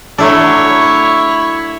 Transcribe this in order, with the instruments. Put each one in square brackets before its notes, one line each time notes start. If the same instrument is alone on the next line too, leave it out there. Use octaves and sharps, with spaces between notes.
[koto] F#3 A3 D4 [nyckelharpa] E4 C#5